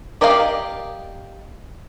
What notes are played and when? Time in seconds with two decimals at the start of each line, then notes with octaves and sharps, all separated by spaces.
0.21 G4 A#4 D5 D#5 F5